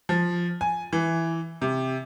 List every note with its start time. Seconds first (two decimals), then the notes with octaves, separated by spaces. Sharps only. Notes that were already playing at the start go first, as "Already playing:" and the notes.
0.09 F3
0.61 G#5
0.93 E3
1.62 C3